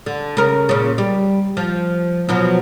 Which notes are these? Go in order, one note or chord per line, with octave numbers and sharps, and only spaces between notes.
D3
C#3 A#4
A#2 C#3
G3
F3
B2 F3 F#3